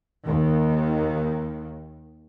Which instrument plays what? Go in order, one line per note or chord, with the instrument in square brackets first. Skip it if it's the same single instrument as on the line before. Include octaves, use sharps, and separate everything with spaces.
[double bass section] D#2 D#3